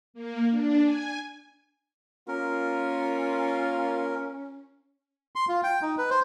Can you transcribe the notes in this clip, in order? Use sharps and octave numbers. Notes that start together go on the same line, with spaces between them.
A#3
D4
G#5
A#3 C#4 F4 A#4
C6
F4
G5
D#4
B4
C5